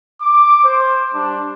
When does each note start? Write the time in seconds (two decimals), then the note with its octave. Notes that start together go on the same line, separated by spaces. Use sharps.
0.21 D6
0.64 C5
1.13 G3 D4